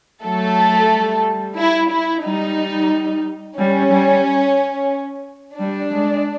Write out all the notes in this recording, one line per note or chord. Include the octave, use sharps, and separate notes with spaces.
F#3 A3 A4
G3
E4
E4
G3 D#4
G3 C#4
G3
G3 D4
G#3